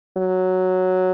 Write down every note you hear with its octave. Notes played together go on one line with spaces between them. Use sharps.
F#3